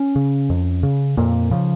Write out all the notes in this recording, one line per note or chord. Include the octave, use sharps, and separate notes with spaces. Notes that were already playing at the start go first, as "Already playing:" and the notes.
Already playing: C#4
C#3
F2
C#3
F2 A#2 A#3
C#3 F3